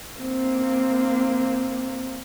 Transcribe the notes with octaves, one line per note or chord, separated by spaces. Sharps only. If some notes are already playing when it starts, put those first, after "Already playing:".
A#3 C4